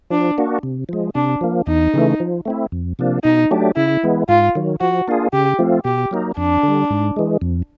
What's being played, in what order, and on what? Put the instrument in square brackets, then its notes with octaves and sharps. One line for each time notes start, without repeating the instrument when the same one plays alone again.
[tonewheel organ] F3 [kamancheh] D4
[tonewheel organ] A#3 D4 F#4
C3
F3 G#3
[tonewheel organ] C3 [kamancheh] D4
[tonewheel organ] F3 A#3
[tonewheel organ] E2 [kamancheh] D#4
[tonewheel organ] C#3 E3 A3
F3
A3 C4 E4
F2
C3 F3 A#3 D4
[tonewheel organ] B2 [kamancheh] D#4
[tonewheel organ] F#3 A3 D4 G4
[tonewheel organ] C#3 [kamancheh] E4
[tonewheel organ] E3 G#3 B3 E4
[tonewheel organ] G#2 [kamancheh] F4
[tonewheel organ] D#3 F#3
[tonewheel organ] F3 [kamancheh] F#4
[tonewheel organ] A#3 D4 F4 G#4
[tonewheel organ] C#3 [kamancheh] G4
[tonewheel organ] F3 A3 C4 F4
[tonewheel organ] B2 [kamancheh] G4
[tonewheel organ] F#3 A#3 D#4
[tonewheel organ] F2 [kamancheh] D4
[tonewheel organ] D3
G3
G#2
E3 G#3
F2